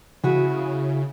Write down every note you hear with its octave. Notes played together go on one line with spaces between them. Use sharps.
C#3 E4 F#4 G#4